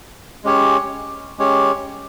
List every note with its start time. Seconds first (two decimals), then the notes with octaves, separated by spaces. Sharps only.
0.44 G#3 C#4 G4 C#5
1.38 G#3 C#4 G4 C#5